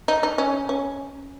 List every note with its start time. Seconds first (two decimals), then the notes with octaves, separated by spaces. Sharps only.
0.08 D#4
0.23 D#4
0.38 C#4
0.69 C#4